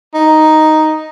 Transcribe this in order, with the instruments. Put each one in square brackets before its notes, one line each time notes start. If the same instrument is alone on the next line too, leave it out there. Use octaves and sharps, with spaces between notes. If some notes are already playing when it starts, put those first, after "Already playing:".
[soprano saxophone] D#4